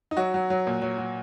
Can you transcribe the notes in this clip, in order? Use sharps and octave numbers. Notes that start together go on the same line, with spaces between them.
D#4
F#3 F#4
F#3
F#3
A#2
F#3
F#3